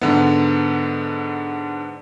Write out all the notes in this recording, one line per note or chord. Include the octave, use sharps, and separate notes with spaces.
G#2 D3 B3